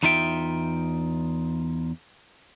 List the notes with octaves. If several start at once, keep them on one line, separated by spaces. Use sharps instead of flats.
E2 D#4 F4 E5 G5